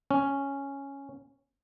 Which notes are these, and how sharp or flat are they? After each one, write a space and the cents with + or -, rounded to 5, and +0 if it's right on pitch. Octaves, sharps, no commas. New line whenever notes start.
C#4 +0